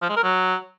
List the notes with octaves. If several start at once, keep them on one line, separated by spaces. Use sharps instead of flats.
F3
G#3
A#4
F#3